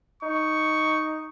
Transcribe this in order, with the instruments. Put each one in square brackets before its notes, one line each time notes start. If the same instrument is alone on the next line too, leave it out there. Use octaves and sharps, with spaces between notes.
[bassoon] D#4 [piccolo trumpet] C#6